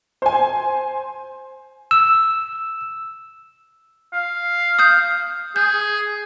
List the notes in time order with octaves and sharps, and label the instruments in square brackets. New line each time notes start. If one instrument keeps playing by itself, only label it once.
[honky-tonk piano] C5 G#5
[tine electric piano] E6
[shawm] F5
[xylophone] D#6 G6
[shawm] G#4 [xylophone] G6